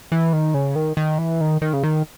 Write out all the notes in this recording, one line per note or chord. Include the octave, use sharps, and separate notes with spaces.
E3
D#3
C#3
D#3
D#3
E3
D#3
D#3
C#3
D#3